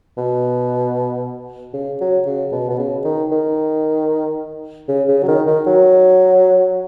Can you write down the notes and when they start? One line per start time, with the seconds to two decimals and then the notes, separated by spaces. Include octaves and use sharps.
0.18 B2
1.74 C#3
2.01 F#3
2.27 C#3
2.52 B2
2.70 B2
2.79 C#3
3.05 D#3
3.32 D#3
4.89 C#3
5.08 C#3
5.23 F#3
5.28 D#3
5.47 D#3
5.67 F#3